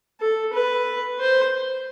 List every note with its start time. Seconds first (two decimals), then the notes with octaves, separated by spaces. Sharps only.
0.20 A4
0.53 B4
1.19 C5